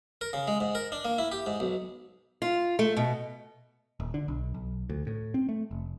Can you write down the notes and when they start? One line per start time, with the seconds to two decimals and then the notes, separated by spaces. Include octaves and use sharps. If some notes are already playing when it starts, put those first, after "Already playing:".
0.21 A#4
0.33 C#3
0.47 G#3
0.60 G#2
0.75 A#4
0.92 D4
1.05 A#3
1.18 E4
1.32 G4
1.46 G#2
1.60 B1
2.42 F4
2.79 A3
2.97 B2
4.00 D#1
4.14 D3
4.28 B1
4.54 B1
4.89 D2
5.07 A2
5.34 C4
5.49 A3
5.71 F1